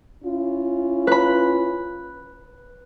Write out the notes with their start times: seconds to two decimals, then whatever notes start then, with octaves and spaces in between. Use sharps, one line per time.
0.24 C#4 E4 F4
1.07 B4 B5